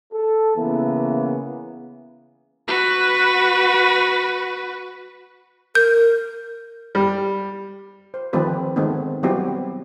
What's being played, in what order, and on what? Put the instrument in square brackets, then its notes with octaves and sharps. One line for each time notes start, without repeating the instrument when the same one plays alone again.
[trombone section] A4
C#3 E3 A#3 B3
[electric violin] F#4 B4
[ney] A#4 [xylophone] G6
[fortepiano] G3
[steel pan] C5
D#3 F3 A3 C4 G4 B4
D#3 G#3 A3 B3 C4 D#4
F#3 G3 B3 C4 E4 G4